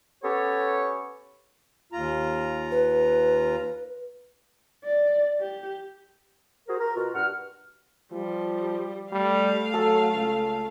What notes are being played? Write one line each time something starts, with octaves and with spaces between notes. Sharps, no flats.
B3 C#4 G4 A4 C#5
D#2 F4 A#5
B4
D5
G4
F#4 G#4 A#4 C5
A#4
B2 F4 F#4 A#4
G2 F#5 F6
F3 G3
G3 A3 F5
F#3 A4
C#2